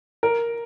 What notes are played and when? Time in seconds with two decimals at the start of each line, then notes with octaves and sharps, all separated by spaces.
0.23 A#4